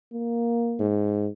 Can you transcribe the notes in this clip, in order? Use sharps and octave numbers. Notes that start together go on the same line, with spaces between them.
A#3
G#2